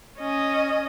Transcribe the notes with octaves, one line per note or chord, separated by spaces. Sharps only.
C#4 D#5